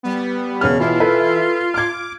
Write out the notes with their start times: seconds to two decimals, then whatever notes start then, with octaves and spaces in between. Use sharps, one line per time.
0.03 G3 B3
0.61 E1 C#3 F6
0.80 B2 E3 E4 F4
1.00 A4 B4
1.74 D6 F6 G#6